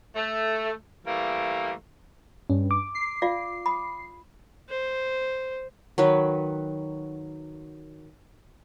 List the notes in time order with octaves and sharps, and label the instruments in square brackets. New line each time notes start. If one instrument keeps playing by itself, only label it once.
[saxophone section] A3
E3 G3 A3 A#3
[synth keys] G2 [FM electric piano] C#4
[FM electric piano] D6
[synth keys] C7
[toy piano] F4 D5 F5
B5 D#6
[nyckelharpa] C5
[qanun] D#3 F#3 B4